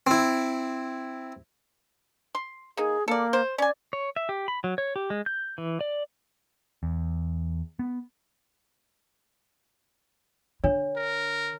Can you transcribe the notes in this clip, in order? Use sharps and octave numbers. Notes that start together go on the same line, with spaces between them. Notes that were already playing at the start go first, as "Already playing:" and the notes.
C4 E4
C6
A#3 D#4 G#4
A#3 A4 D5
C5
C#4 D5 G#5
C#5
E5
G4
B5
F#3
C#5
G4
G#3
G6
E3
D5
E2
B3
D3 D4 C#5
A#4